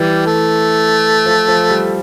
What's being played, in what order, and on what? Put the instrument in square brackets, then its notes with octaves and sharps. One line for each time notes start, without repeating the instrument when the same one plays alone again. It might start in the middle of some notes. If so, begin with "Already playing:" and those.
Already playing: [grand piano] E3 [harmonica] G3
[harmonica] A3
[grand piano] F3
F3
G3